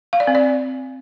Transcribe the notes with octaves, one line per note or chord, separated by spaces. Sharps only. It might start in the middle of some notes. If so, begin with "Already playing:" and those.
F5
D5
C4
D5